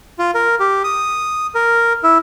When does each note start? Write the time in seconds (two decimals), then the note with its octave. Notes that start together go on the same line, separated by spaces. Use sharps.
0.19 F4
0.34 A#4
0.60 G4
0.84 D#6
1.55 A#4
2.04 E4